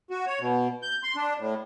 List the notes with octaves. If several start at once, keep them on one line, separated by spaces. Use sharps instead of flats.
F#4
C#5
B2
G6
C6
D4
A2